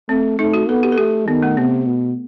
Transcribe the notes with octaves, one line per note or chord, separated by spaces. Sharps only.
A3 C4
A3 D#4
F#4
B3 A4
G4
A4
A3 G4
D#3 B3
A3
C3 B3
B2